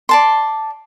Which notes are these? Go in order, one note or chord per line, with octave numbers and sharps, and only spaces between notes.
D5 A5 C6